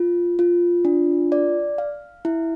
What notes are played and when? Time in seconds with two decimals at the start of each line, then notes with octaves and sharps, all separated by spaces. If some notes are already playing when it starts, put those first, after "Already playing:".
Already playing: F4
0.39 F4
0.85 D4
1.32 D5
1.78 F5
2.25 E4